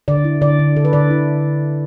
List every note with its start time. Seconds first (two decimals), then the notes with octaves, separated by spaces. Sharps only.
0.08 D3 D5
0.24 E4
0.41 D3 D5
0.59 D3
0.76 D3 A4
0.85 B4
0.93 D3 D5
1.10 E4